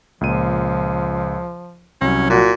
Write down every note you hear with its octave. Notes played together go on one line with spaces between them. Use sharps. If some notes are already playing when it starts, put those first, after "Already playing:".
C#2 A#2 F3 D#7
C2 F#3 C#4
A#2 F#4